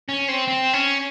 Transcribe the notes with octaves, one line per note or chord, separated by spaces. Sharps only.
C#4
C4
C4
C#4